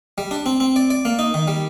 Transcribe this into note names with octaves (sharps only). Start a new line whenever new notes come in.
G3
D4
C4
C4
D5
D5
A#3
D#4
D#3
G3